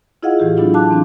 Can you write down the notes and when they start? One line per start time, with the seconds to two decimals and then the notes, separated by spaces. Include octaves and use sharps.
0.23 E4 F4 G#4 D#5 F5 F#5
0.39 A2 E3 G4 G#4
0.57 F#3 B3 D4 E4 F4
0.74 F5 A5 D6 F#6
0.89 E3 C4 D4